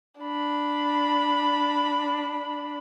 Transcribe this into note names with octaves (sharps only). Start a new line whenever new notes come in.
D4 B5